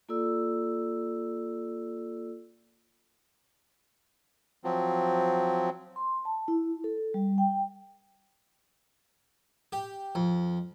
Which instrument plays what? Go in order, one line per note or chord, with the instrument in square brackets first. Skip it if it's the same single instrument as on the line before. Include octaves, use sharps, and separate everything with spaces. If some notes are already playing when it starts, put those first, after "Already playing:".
[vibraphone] A#3 F4 A4 D5 E6
[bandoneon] F3 F#3 C4
[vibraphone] C6
A5
E4
A4
G3
G5
[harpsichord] G4
F2